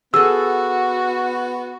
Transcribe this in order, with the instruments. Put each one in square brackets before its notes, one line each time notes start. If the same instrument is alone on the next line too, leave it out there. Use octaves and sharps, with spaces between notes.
[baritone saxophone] B3 [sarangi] F#4 [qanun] G#4 A4 [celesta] E6